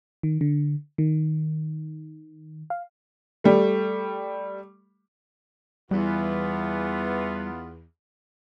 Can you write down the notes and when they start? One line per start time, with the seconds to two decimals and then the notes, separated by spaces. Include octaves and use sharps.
0.23 D#3
0.41 D3
0.98 D#3
2.70 F5
3.44 G3 A3
5.91 E2 E3 G3 B3 F4